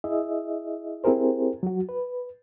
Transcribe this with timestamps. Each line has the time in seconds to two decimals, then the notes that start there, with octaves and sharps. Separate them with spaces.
0.04 E4 G#4 D#5 E5
1.04 C4 E4 G4 G#4 A#4 C5
1.63 F#3 F#4
1.89 B4